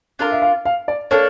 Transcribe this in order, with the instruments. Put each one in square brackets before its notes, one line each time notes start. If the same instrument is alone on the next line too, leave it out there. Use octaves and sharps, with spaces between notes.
[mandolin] D4 F4 A#4 [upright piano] A4
[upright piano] E5
F5
F5
D5
[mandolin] A#3 D4 A4 [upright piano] C#5